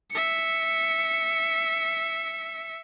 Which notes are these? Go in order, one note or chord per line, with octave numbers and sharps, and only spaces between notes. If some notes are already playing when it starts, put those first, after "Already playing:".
E5 C#7